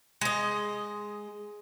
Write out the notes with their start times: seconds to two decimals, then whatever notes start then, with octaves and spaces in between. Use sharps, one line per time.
0.21 G#3 D#5